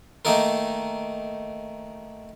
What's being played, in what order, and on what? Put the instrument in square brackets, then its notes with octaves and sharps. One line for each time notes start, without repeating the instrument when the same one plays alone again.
[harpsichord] D#3 A3 A#3 D#4 A4 A#4